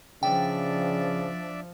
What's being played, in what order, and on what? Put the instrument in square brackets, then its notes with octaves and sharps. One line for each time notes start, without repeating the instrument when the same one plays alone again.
[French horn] C#3 [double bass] F3 [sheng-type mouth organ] D4 D5 E5 [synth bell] G5